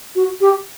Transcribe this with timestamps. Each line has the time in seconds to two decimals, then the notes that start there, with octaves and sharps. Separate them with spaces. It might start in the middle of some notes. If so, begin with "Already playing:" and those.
0.15 F#4
0.41 G4